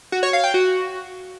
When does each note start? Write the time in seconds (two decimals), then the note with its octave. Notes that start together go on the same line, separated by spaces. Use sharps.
0.12 F#4
0.23 C#5
0.33 F5
0.44 G5
0.54 F#4